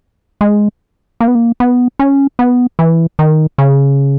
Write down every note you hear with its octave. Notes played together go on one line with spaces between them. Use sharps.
G#3
A#3
B3
A#3
B3
C#4
B3
E3
D#3
C#3